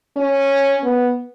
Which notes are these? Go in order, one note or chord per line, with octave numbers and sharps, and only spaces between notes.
C#4
B3